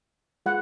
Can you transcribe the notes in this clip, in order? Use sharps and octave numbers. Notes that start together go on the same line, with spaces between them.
G#3 F4 F#5